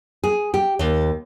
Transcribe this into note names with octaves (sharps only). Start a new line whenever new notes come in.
G#4
G4
D#2